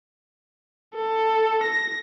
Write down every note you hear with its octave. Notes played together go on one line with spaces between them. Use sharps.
A4
A#6